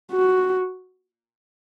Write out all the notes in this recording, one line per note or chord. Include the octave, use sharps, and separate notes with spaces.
F#4